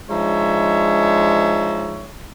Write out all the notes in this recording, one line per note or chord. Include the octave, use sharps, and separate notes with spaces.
F3 G#3 D4 D#4 C#5 E5